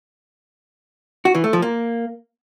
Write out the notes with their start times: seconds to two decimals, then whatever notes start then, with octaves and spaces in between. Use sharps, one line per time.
1.25 F#4
1.35 E3
1.44 A3
1.53 F3
1.62 A#3